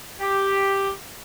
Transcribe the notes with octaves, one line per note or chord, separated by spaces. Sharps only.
G4